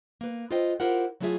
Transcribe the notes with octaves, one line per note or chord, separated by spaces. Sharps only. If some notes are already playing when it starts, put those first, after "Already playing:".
A#3 B4
F4 A4 B4 C5 D#5 G5
E4 F4 G4 A#4 C5 F#5
F#3 A3 E4 F4 G#4 E5